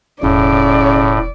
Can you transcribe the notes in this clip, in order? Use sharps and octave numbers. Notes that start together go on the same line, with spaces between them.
E1 A2 C#3 D5